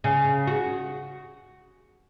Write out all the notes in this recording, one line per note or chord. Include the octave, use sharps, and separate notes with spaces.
C#3
F#4